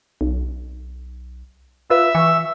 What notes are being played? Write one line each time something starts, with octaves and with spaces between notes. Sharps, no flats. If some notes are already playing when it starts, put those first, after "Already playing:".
B1
F4 B4 E5 E6
E3 C#6